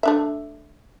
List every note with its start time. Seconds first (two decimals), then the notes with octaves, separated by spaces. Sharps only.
0.03 A3 D4 E5